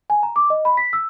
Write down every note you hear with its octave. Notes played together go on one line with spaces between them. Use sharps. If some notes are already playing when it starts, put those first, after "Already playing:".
G#5
A#5
D6
D#5
B5
B6
E6